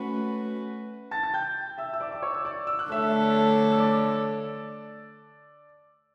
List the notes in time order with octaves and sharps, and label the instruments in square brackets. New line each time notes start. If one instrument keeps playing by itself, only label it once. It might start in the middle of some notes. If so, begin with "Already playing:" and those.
Already playing: [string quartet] A3 C#4 F#4 B4
[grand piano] A5 A6
A6
G5 G6
E5 E6
E6
D5 D6
D6
C#5 C#6
E6
D5 D6
E6
F#6
[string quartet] D3 A3 D4 A4 C#5 [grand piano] E5 E6
[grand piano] E6
D5 D6